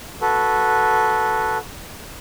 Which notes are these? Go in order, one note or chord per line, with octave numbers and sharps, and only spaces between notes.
F#4 A4 B4